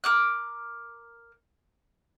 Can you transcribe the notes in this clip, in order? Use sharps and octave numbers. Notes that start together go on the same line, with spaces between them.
A#4 D6 F#6